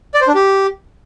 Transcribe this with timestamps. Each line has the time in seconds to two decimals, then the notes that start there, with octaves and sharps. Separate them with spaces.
0.14 D5
0.21 C5
0.28 D4
0.34 G4